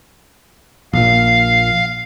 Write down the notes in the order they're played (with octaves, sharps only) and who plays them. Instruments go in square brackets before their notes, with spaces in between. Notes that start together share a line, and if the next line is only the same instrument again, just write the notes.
[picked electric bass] A#1 A#2 [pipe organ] F5